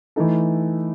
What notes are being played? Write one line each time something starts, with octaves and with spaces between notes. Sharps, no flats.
E3 A3 D#4 A4